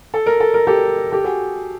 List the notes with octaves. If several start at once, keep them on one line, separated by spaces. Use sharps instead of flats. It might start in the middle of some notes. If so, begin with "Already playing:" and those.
A4
A#4
A4
A#4
G4 A4
G4 A4
F#4 G#4